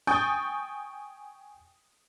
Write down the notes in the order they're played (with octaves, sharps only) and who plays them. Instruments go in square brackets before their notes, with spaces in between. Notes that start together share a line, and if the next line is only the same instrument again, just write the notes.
[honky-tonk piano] G5 G#5 C#6 D#6 G6 A6